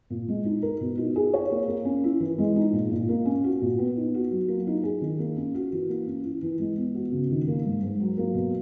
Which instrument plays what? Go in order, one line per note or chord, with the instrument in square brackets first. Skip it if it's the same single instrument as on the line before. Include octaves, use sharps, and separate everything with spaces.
[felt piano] A#2
G#3
D#4
A#4
B2
D#4
G#4
C#5
A#3
A#3
C#4
E4
E3
G#3
D#4
A#2
A#2
A#3
C#4
F#4
A#2
B3
D#4
F#4
F#3
A#3
D#4
G#4
D#3
A#3
C#4
F#4
E3
A#3
C#4
E4
E3
G#3
B3
F#4
C#3
D#3
A#3
G#2
G#2
F#3
A#3
B2